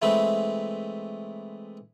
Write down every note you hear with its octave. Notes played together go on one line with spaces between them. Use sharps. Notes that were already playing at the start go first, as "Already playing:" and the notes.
E3 G#3 A3 C4 B5